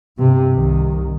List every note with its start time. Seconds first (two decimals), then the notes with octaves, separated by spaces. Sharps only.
0.18 G2 C3
0.54 C2 D#3